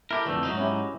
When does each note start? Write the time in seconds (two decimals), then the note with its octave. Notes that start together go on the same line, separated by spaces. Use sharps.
0.11 E4 G4 A4 A#4
0.26 F2 D3 E3 A3
0.43 G#2 F#3 D#4
0.58 C#4 E4 G4